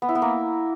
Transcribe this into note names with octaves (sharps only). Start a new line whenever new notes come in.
B3
E4
B3
A#3